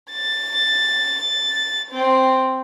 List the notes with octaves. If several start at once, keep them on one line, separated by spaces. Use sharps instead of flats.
A6
C4